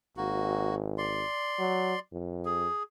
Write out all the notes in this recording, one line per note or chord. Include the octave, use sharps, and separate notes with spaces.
G#1 A#3 F#4
D5 C6
F#3
F2
G#4